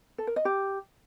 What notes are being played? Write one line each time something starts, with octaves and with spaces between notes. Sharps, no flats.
A4
A#4
D#5
G4